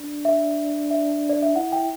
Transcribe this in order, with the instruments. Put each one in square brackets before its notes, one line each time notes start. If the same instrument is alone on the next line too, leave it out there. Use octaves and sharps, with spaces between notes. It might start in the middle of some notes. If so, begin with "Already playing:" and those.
Already playing: [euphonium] D4
[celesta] E5
E5
D5
E5
[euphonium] E4 [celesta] F#5
[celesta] G5